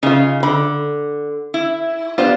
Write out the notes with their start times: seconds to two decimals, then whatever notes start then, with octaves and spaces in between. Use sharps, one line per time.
0.03 C#3 D#4 F4
0.43 D3 B5
1.54 E4
2.18 B3 D4 F4 G4 C5